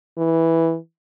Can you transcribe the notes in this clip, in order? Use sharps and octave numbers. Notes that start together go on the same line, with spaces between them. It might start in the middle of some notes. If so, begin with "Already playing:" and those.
E3